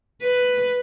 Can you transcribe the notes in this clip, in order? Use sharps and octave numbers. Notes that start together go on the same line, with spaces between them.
B4